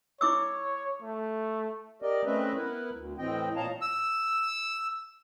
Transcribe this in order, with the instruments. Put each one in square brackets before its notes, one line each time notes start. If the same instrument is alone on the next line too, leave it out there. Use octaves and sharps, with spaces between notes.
[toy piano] E4 D6 E6 [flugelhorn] C#5
[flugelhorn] A3
[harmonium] G4 A#4 D5 D#5
A3 C4 C#4 B4 D#5 E5
B3 E4 A#4 B4
D2
A2 E3 C4 D#5 G5
A#2 C#5 D#5 F5 A5 A#5
[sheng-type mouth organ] E6